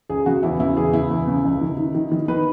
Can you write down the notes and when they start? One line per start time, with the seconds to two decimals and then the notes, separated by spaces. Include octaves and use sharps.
0.10 C#2 G#4
0.26 C#3 F#4
0.43 E2 E4
0.59 C#3 E4
0.76 E2 G#4
0.93 C#3 E4
1.11 E2
1.27 C#3
1.44 C#2
1.61 D#3
1.78 D#3
1.95 D#3
2.12 D#3
2.28 D#3 B4